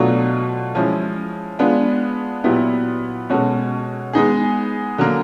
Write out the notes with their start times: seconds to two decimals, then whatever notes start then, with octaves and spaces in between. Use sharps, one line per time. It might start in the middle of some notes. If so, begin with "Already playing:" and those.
Already playing: B2 F#3 A3 D4 F4
0.75 F3 G#3 C#4 E4
1.59 G#3 B3 D4 F4
2.44 A#2 F#3 B3 E4 G4
3.29 B2 G#3 C#4 F#4 A4
4.13 G#3 B3 D#4 G#4
4.98 D3 F#3 A#3